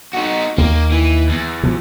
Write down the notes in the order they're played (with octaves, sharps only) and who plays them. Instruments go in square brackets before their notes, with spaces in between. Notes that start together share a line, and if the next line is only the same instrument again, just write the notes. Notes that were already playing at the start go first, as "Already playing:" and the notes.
[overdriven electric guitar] D#4 F#4
[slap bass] D#2 [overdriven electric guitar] A#3
[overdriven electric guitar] E3
E2
[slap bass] B2 F3